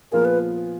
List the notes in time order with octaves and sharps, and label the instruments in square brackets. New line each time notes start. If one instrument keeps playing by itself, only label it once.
[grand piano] A#2 F3 B3 F4 G#4 [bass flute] A#4
[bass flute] B4